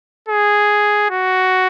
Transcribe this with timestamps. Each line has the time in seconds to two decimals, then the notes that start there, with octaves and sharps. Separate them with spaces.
0.28 G#4
1.11 F#4